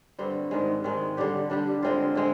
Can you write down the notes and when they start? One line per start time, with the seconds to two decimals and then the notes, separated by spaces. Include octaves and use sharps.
0.19 G2 D3 G3 C4
0.51 G#2 D#3 G#3
0.84 G#2 D#3 G#3
1.17 D3 G3 D4 G4
1.50 D3 G3 D4 G4
1.83 D3 G#3 C4 F4
2.15 D3 G#3 C4